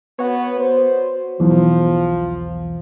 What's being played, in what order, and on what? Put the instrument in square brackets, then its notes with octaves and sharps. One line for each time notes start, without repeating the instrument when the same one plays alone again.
[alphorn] B3 [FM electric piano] F#4 C#5
[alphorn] C5
[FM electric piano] B1 E2 [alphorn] F3